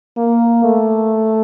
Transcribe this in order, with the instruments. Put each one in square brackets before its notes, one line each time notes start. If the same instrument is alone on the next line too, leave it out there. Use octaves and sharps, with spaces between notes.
[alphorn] A#3
A3